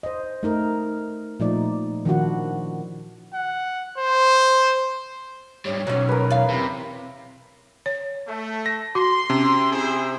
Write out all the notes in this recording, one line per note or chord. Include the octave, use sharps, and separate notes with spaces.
C5 D#5
A3 D#4 A#4
A#2 F3 A3 D#4 D5
D#3 F3 D4 E4 F#4 F#5
F#5
C5
G#2 G3 C#5
B1 F#3 C#4
A#4 B4
E2 F5
C3 E4 A#5
C#5
A3
A#6
F#4 C6
C3 C#4
E4 G#4 C5